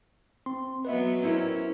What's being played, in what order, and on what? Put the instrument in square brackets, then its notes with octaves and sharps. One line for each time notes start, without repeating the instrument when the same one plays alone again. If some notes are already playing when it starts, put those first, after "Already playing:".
[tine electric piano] C4 C6
[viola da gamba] F#3 B3 F#4 [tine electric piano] B4 D#5 E5
[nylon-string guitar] C4 E4 A#4 [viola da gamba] C#4